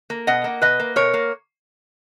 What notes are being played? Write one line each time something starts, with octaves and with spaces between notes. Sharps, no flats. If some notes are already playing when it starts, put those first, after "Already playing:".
A#3
B2 D#5 F#5
A#3
B2 B4 D#5
A#3
B2 A#4 C#5
A#3